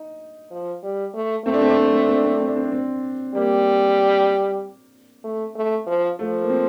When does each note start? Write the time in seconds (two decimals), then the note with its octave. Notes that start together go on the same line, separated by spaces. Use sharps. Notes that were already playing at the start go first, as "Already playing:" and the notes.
Already playing: D#4
0.51 F3
0.83 G3
1.14 A3
1.45 A3 C4
1.54 D4
1.61 C4
1.69 D4
1.77 C4
1.85 D4
1.93 C4
2.01 D4
2.09 C4
2.16 D4
2.25 C4
2.32 D4
2.40 C4
2.48 D4
2.56 C4
2.64 D4
2.72 C4
3.34 G3 A#3
5.24 A3
5.55 A3
5.87 F3
6.18 F3 A3
6.41 A#3
6.50 C4